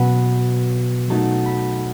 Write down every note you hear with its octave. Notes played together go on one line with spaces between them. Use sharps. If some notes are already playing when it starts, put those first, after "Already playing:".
Already playing: B2 F#3 B3 B5
F#3 A3 D#4 A5
B5